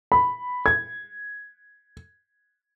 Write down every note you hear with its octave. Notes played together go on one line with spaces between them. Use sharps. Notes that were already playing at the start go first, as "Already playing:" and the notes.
B5
G#6